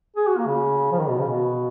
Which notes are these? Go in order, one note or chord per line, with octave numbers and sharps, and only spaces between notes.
G#4
F#4
A#3
C#3
F3
D#3
B2
C#3
B2